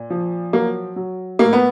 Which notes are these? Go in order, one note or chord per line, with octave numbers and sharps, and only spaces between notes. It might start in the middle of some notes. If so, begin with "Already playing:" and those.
Already playing: A#2
F3
F#3 A#3
F#3
A2 A#3
B3